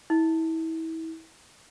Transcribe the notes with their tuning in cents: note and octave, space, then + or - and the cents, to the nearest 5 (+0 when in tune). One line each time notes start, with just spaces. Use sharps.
E4 -30